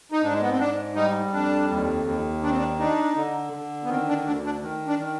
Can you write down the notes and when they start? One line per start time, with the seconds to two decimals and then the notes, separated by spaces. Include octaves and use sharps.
0.12 D#4
0.23 G#2 D4
0.32 G#3
0.41 B3
0.50 C4
0.59 G#2 D4
0.95 G3 D#4
1.33 F2 D4
1.69 D#2
2.06 D#2
2.43 D#3 D4
2.50 C4
2.57 D4
2.79 D4 D#4
3.16 D3
3.53 D3
3.84 B3
3.89 D#3 C4
4.08 D4
4.26 D2 D4
4.45 D4
4.63 D#3
4.87 D4
5.00 D#3